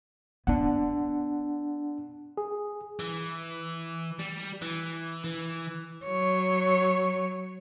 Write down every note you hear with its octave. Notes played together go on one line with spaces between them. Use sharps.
B3 D4 F#5
G#4
E3
G3
E3
E3
F#3 C#5